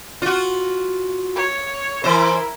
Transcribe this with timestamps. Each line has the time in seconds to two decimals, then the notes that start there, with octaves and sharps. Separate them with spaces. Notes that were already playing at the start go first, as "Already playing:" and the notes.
0.22 F4 F#4
1.35 C#5
2.04 E3 E4 A#4 C5